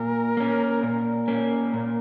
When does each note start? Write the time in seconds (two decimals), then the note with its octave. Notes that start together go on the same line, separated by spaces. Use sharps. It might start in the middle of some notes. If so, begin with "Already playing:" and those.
Already playing: A#2 A#4
0.37 A#3 C#4
0.82 A#2 A#4
1.28 A#3 C#4
1.74 A#2